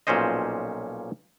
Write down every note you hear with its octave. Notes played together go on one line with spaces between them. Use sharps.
B1 A#2 F3 C#4 C5 D#5